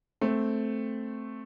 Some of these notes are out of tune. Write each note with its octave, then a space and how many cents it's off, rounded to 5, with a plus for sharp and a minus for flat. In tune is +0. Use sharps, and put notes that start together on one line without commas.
A3 +0 C4 +0